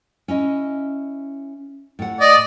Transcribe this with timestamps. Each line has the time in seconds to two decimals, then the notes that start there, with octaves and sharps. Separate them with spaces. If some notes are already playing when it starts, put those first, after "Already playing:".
0.28 C#4 E4 D#5
1.99 A2 F#5
2.21 D5 D#5